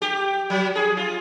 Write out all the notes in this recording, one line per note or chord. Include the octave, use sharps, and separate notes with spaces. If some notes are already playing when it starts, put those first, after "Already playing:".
G4
F#3
G#4
F4